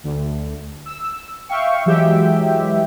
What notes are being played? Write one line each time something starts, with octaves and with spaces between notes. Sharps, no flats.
D2
E6
E5 F5 G5 C#6
E3 F#3 G#3 G4 E5 G5